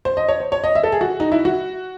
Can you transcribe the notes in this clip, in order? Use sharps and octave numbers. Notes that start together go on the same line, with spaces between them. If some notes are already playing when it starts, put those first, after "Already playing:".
C5
D#5
C#5
C5
C#5
D#5
E5
A4
G#4
F#4
D#4
E4
F#4